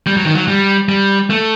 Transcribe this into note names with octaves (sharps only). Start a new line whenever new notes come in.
G3
F#3
D#3
F#3
G3
G3
A3